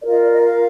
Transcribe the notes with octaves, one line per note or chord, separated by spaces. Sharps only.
F4 A#4 D5
D#5
D5
D#5
F5